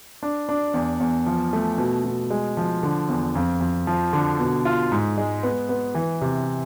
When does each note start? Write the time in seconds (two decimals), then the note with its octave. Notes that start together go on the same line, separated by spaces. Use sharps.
0.23 D4
0.49 D4
0.74 E2
1.00 E2
1.26 F3
1.53 A3
1.78 B2
2.04 B2
2.30 G#3
2.57 F3
2.83 D3
3.09 E2
3.35 F2
3.61 F2
3.87 F3
4.13 D3
4.39 B2
4.65 F4
4.92 G#2
5.18 G#3
5.43 B3
5.69 B3
5.95 E3
6.21 C3